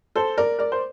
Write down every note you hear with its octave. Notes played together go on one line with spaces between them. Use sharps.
A4 C5
A#4 D5
A#4 D5
C5